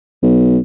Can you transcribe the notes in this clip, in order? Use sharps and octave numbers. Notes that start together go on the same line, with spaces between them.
B1